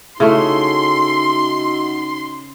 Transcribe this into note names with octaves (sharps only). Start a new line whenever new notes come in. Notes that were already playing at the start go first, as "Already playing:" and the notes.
C#3 A3 D#4 E4 F#4 C6